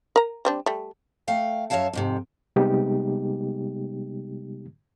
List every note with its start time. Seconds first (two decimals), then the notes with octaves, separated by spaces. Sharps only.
0.16 A#4 A#5
0.45 G3 C4 D4
0.66 G3 A3
1.28 A3 F5 G5
1.70 F#2 G3 C#5 E5 F5 A5
1.93 F2 G#2 C3
2.56 C3 G3 G#3 B3 D#4 G4